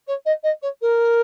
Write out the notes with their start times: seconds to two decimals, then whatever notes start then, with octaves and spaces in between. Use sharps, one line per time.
0.07 C#5
0.25 D#5
0.43 D#5
0.62 C#5
0.81 A#4